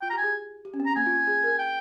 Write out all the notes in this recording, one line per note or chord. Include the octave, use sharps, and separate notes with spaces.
F4 G5
A#5
G4
G#5
G#4
G4
C#4
C4
A#5
A#3 G#5
F4
G#4
A#4
G5